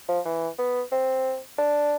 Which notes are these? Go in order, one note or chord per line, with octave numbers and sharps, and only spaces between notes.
F3
E3
B3
C4
D4